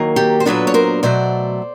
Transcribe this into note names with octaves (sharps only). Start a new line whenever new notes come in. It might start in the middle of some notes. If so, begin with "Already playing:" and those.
Already playing: D#3 F#3 A#3
G4 A4
C5
A#2 F#3 B3 D4 A4 B4
C#5
A#4 C5
B2 F#3 A3 C5 D5